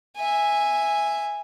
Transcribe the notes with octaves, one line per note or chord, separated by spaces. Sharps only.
E5 G#5